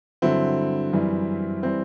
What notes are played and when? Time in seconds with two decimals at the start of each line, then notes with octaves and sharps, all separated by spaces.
0.22 G2 D3 F#3 C4 E4
0.93 F#2 E3 G3
1.63 E3 G3 C4